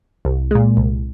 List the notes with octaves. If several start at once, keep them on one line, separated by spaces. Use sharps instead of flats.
C2
A#2 G#3
C2